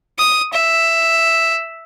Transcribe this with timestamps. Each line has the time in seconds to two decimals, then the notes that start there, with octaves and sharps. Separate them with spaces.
0.19 D#6
0.53 E5